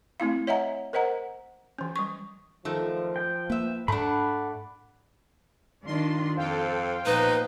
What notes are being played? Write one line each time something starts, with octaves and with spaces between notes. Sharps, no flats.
A3 C4 E4 F5
C#5 D#5 E5 F#5 G#5 A#5
A#4 C5 D#5 F#5 A#5
E3 C#4
G3 C#6
F#2 D#3 F3 A3
G5
A#3 B4 E5
G#2 A3 D4 F#5 B5
D#3 D4 F4 C6
F2 A4 C5 F5 G5
A#2 F3 B3 D#4 B4